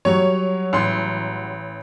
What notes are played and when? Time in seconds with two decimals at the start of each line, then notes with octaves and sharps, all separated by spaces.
0.05 F#3 G3 C#5
0.73 A1 C6